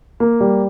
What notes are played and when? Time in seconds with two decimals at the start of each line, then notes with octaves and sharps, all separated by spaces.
0.20 A#3
0.41 G3